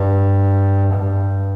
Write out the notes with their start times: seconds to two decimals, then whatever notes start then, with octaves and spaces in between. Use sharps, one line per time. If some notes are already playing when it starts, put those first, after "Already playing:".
Already playing: G2
0.94 G2